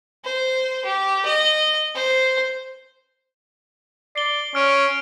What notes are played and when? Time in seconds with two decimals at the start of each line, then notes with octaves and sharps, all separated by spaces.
0.25 C5
0.85 G4
1.25 D#5
1.95 C5
4.16 D5 C7 G7
4.55 C#4 F6 D7